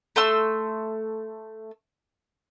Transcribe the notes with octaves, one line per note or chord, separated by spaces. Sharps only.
A3 C6 E6